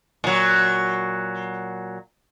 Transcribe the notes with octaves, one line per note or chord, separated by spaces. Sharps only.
A#2 F#3